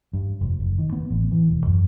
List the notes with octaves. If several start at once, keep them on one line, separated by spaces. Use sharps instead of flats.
G2
F1
F#1
D#3
B3
A1
E3
E1
F#2